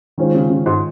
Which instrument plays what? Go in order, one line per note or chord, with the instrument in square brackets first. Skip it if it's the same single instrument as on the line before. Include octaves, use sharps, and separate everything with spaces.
[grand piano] D#3 G#3 C#4 F4 C5
[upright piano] C#3
C#3
G#2